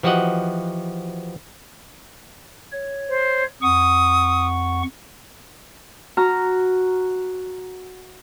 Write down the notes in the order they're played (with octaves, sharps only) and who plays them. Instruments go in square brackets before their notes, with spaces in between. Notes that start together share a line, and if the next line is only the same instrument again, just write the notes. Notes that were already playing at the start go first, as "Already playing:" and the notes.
[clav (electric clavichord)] E3 F3 F#4 G4 D#5 F#5
[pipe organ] C#5
[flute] C5
[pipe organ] F2 F#5 C#6 [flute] D#6
[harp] F#4 A#5 F6